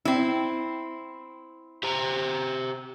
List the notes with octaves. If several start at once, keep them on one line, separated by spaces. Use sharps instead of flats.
C4 E4
G4 C5 A#5